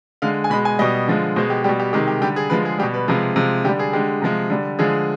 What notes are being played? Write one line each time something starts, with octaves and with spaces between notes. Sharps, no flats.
D3 G#3 F5
G#5
B2 G#3 B5
G#5
B2 G3 D#5
D3 F3 G#3
B2 G#3 C5
G4
B2 G3 G4
G4
C3 D#3 G#3 G4
G4
D3 G3 G4
G#4
D3 F3 G#3 B4
G#4
B2 G3 G4
B4
C3 F3 G#3
C3 F3 G#3
D3 G3 G4
G#4
D3 G#3 G4
C3 F3 G#3
D3 G3
D3 F3 G#3 G#4